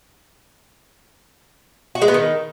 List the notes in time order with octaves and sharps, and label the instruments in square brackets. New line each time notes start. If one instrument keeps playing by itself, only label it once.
[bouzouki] F#4
G#3
B3
D#3